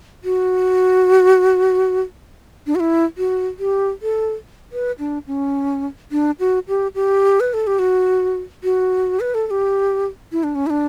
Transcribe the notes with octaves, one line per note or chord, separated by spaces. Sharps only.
F#4
D4
F#4
E4
F#4
G4
A4
B4
D4
C#4
D4
F#4
G4
G4
B4
A4
G4
F#4
F#4
B4
A4
A4
G4
E4
D4
C#4
E4
D4